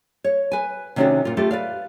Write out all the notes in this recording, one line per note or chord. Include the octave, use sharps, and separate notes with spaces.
C#5
B4 G#5
C3 D#3 C#4 D4 F#4 A4
A#2 F4
A3 F4 G4 A4
B4 D5 F5